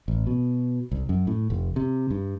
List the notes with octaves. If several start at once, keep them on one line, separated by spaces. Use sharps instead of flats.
A1
B2
C2
F#2
A2
F1
C3
G2